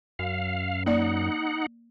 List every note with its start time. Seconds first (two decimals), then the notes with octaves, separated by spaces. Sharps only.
0.19 F#2 F5
0.86 A#3 D#4 D5 F#5